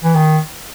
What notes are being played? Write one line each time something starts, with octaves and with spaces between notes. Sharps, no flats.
E3
D#3